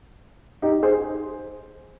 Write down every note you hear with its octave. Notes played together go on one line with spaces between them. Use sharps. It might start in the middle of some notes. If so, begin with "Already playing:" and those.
D#4 G4
G#4 C5